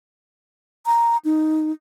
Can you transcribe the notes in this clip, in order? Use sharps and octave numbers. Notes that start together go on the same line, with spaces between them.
A#5
D#4